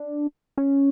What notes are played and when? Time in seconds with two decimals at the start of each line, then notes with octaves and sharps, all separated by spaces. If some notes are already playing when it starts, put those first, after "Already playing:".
Already playing: D4
0.58 C#4